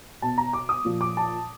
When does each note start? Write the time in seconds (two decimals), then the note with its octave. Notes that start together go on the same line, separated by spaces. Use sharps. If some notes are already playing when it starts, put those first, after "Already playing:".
0.22 B2 A5
0.38 A#5
0.53 D6
0.69 D#6
0.85 A#2 F3
1.01 D6
1.17 A5